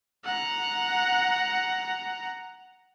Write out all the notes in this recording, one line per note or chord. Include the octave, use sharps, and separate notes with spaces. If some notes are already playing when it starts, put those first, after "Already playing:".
F#5 A#5